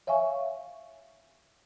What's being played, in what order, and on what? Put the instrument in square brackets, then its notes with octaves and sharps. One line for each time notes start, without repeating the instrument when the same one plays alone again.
[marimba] C#5 E5 F5 G#5 C#6